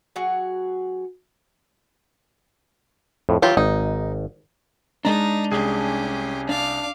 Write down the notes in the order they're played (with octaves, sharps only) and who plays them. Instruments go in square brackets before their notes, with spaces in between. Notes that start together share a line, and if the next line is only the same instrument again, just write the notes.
[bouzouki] F#3 F#4 G#4
[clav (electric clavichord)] F2 A2
[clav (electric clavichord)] E3 [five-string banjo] F#3 F4 G4
[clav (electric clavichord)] G#1 [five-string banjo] D#4
[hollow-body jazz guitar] G#3 A#5 [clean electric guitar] D4 [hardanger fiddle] D#4
[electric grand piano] C2 G#4 G#5 [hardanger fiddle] C#4 G4
[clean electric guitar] D4 [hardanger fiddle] F5 D6